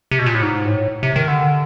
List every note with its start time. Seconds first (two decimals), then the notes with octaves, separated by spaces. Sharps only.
0.11 C3
0.19 B2
0.26 A#2
0.35 A2
0.42 G#2
0.66 A2
1.03 C3
1.16 D#3
1.28 D3